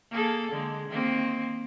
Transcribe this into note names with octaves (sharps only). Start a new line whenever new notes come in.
A#3 G#4 A4
D3 G#3
D#3 A#3 C4